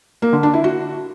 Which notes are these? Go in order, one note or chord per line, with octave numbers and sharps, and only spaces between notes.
A#3
D3
D4
E4
F#4